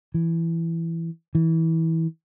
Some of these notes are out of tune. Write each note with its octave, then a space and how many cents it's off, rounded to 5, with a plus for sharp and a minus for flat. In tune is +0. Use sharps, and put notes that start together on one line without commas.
E3 +10
E3 -20